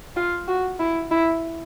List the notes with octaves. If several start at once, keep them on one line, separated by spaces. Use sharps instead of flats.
F4
F#4
E4
E4